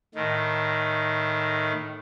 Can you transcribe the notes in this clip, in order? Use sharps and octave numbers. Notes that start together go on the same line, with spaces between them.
A2 D#3